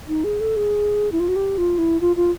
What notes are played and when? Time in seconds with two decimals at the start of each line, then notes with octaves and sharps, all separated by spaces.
0.08 D#4
0.24 G#4
0.40 A4
0.56 G#4
1.12 E4
1.20 F4
1.28 F#4
1.36 G4
1.58 F4
1.78 E4
2.01 F4
2.16 F4